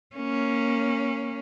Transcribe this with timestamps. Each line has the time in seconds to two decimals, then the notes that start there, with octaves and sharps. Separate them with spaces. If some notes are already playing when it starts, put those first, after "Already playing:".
0.16 A#3 C#4